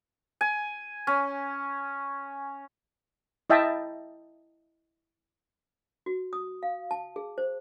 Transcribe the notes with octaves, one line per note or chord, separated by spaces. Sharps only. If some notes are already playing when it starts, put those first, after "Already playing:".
G#5
C#4
E4 D#5 E5 G5 A5
F#4
D#6
F5
A5
G#4
C5